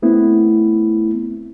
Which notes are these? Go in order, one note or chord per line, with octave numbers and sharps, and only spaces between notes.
A3 B3 C4 E4